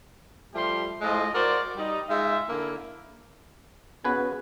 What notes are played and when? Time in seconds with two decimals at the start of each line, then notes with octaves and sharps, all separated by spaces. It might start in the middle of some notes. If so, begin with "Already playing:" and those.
0.53 F3 G3 A3 G4 C6
1.01 A2 G#3 F4 C5 D#5
1.33 F#4 A#4 C5 D5
1.76 G3 D#4
2.09 G#3 D#4 F4 E5
2.48 D3 A#3 E4
4.04 C#3 B3 F#4 B4 G#5